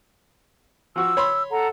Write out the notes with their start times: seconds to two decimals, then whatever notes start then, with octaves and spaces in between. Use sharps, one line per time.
0.96 F3 F#4 E6
1.17 C#5 B5 C6
1.51 A4 F#5 A#5